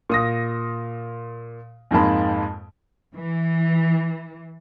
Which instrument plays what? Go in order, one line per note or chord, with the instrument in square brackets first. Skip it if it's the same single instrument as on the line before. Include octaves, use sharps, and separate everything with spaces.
[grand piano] A#2 D#6 A#6
F2 G#2 G#3 A#3 A5 B5
[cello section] E3